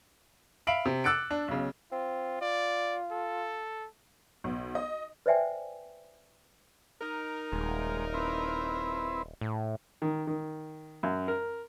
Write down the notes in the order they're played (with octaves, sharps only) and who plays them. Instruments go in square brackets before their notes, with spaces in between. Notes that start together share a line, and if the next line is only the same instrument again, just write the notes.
[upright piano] E5 F5 B5 D7 F#7
C3
D6 E6 F#6 A6 C#7 D7
D4
B1 C#3
[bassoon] C4 [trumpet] F4
[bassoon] F4 [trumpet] D5
[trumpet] A4
[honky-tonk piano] B1
D#5
[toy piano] B4 C5 D5 E5 G5 G#5
[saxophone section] D#4 A#4
[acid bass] D#1 [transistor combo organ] G#3
[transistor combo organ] C4 E4 B4
[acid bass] A2
[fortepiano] D#3
D#3
F#2
A#4